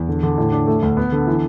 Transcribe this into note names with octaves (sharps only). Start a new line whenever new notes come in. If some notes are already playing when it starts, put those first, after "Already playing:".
Already playing: E2
D3
D3
A2
D4
A3
D2
B3
D3
E3